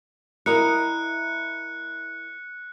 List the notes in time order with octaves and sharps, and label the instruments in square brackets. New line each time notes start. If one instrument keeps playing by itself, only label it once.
[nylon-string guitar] E4 A#4 D#5 [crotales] F#6 C#7